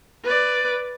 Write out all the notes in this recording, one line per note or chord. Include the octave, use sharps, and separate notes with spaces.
B4 D5